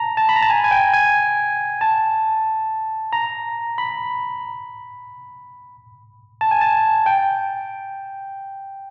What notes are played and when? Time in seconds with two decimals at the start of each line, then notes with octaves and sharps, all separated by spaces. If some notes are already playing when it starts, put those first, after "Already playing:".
Already playing: A5 A#5
0.17 A5
0.29 B5
0.36 A#5
0.42 A5
0.50 G#5
0.64 G#5
0.71 G5
0.94 G#5
1.81 A5
3.13 A#5
3.78 B5
6.41 A5
6.51 G#5
6.61 A5
7.06 G5